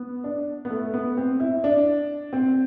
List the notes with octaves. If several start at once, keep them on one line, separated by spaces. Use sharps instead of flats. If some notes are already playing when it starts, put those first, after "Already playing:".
Already playing: B3
D4
B3
A3
B3
C4
E4
D4
C4